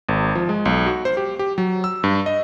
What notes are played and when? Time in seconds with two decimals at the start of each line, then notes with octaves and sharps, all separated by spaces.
0.09 G#1
0.35 F3
0.49 G#3
0.65 B1
0.86 F#4
1.05 C5
1.17 G4
1.39 G4
1.58 F#3
1.84 E6
2.04 G2
2.26 D#5